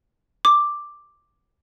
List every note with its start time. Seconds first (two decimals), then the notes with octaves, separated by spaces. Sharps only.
0.45 D6